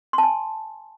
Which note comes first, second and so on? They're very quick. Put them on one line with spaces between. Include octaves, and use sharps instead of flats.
C6 A5 G#5